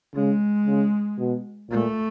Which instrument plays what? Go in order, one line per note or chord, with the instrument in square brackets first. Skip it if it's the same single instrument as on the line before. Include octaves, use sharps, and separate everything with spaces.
[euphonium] C#3 [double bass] G#3
[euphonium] C#3
B2
[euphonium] A#2 [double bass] A3